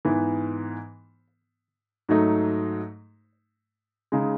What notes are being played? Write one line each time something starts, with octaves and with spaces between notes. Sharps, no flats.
G#2 E3 B3
G#2 F#3 A3 D#4
C#3 G#3 D#4